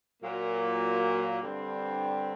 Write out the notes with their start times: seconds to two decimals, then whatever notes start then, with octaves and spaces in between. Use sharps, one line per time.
0.23 A#2 F#3 A#3
1.42 G2 D3 G3 C4